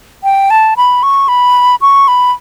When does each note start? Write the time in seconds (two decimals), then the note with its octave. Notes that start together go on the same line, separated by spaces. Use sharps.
0.24 G5
0.50 A5
0.77 B5
1.03 C#6
1.28 B5
1.81 C#6
2.08 B5